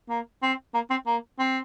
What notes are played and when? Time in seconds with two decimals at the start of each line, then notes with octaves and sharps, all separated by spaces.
0.09 A#3
0.43 C4
0.74 A#3
0.90 C4
1.07 A#3
1.39 C4